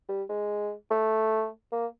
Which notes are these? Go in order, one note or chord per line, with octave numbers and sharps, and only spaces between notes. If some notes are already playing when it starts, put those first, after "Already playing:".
G3
G#3
A3
A#3